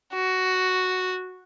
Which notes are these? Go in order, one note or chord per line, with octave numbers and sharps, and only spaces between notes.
F#4